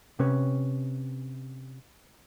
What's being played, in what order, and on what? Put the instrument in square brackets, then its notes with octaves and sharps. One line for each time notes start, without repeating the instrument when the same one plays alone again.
[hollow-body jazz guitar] C3 C#4 B4 C#5